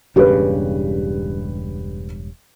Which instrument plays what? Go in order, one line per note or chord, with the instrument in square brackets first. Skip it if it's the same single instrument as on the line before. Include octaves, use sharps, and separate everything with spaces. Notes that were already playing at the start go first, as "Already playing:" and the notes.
[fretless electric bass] E1 G2 C#3 [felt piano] G4 B4